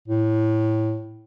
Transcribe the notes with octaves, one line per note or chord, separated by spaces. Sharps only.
A2